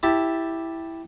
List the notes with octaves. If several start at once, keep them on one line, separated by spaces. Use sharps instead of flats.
E4 G4 A5